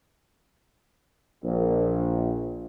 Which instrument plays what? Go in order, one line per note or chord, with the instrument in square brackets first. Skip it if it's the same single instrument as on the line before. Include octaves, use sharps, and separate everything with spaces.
[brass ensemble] A#1